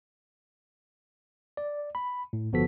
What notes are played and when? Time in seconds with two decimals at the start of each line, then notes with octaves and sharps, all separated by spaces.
1.57 D5
1.95 B5
2.33 A2
2.53 G1 F3 B3 F#4 A4 B6